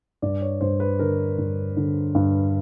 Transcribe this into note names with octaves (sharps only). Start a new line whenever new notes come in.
G2 D5
C#5
G2 C5
B4
D3 A#4
G2
D3
G2